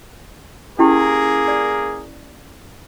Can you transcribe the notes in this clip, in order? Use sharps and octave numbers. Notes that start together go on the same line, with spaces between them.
A#3 C#4 E4 G4 G#4 A#4
D5